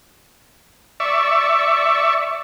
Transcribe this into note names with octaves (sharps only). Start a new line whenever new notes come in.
D5 E5 C#6